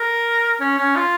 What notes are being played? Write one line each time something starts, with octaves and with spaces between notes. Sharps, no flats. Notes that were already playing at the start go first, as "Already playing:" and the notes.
Already playing: A#4
C#4
C#4
F4